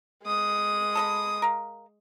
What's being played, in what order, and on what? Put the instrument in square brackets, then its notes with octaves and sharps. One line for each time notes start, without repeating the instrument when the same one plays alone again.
[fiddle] G#3 D#6
[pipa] A4 D#5 B5
A#4 F5